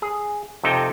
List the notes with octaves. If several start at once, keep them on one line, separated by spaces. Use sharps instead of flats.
G#4
F2 C3 D#4 A4 G5